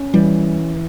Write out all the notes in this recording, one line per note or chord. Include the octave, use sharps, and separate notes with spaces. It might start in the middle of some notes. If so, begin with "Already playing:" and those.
Already playing: C#4
E3 G3